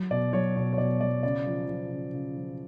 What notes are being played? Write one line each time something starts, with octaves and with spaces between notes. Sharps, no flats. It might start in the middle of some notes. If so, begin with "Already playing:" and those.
Already playing: F#3
B2 D5
F#3 C#5
B2 C#5
C#5
B2 D5
F#3 D5
C#3 D5
F3
F3
C#3
C#3
F3